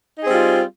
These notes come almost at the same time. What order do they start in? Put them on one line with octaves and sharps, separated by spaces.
D#4 G#4 C4 G3 F4